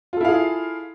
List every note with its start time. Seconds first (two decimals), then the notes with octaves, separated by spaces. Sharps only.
0.13 F4
0.17 A4
0.21 E4
0.24 F5
0.28 G#4